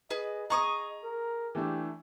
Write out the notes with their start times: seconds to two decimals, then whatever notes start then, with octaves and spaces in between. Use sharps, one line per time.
0.10 G#4 B4 D#5
0.50 G#4 D#5 A#5 C#6 D#6
1.04 A#4
1.55 E3 A3 D4 G4